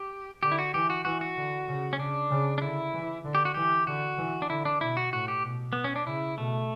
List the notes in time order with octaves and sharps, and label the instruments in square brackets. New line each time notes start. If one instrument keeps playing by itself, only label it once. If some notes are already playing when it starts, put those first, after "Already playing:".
Already playing: [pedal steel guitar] G4
[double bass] D3 [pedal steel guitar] G4
[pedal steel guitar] E4
F#4
[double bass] E3 [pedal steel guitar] G4
[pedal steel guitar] F#4
[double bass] E3 [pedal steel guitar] F#4
[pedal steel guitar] F#4
[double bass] D3
C#3
[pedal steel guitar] C#4
[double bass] C#3 [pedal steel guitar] D4
[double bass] C#3
[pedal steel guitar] D4
[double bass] D3 [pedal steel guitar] E4
[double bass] E3
D3
[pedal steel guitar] G4
F#4
[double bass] E3 [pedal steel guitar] G4
[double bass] D3 [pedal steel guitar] F#4
[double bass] E3
[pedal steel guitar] D4
[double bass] D3 [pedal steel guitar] E4
[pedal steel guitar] D4
[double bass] B2 [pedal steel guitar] E4
[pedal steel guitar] F#4
[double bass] A2 [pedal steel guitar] F#4
[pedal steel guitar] G4
[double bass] B2
[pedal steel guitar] B3
C#4
D4
[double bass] C#3 [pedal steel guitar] E4
[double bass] B2 [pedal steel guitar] A3